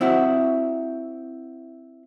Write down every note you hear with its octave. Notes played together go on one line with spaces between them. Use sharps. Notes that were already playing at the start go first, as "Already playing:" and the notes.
C4 E4 F#4